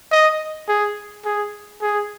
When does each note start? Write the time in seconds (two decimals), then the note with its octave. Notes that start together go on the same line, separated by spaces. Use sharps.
0.11 D#5
0.68 G#4
1.25 G#4
1.82 G#4